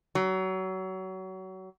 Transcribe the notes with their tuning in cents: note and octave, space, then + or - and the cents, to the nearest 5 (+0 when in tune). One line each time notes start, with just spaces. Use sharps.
F#3 +30